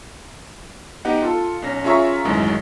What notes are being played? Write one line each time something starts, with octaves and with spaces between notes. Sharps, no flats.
B3 D#4 G4 D#5 F#5
F4 A4
B1 C#4 A#6
C#4 F4 G#4 E5 A#5 C#6
A1 F#2 D#3 E3 F#3 G#3